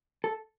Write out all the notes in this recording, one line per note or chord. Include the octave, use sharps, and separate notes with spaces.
A4